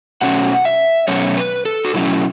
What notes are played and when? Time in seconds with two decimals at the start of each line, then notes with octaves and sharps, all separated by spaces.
0.21 B2 F#3 A3 C#4 F#5
0.65 E5
1.08 B2 F#3 A3 C#4 C#5
1.37 B4
1.65 A4
1.85 F#4
1.94 B2 F#3 A3 C#4 E4